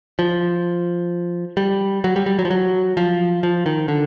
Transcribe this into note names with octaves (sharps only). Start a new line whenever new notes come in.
F3
G3
F#3
G3
G3
F#3
F3
F#3
F3
F3
D#3
D3